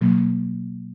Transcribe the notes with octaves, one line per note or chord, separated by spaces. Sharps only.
B2 F#3 A#3